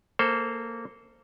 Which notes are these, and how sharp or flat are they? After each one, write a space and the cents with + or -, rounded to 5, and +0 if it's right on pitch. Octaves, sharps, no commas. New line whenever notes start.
A#3 -15 A4 +0 C5 +0